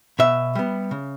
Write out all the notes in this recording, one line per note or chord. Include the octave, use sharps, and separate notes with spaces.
B2 E5
G3 B3
C#3